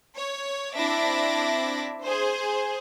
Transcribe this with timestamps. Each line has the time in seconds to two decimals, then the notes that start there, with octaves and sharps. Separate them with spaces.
0.16 C#5
0.75 C4 D4 E4 E5 D6 A#6
2.02 G#4 C5